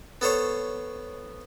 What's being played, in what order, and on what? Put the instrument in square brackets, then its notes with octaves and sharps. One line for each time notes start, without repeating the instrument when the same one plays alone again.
[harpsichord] B3 A4 C5 C#5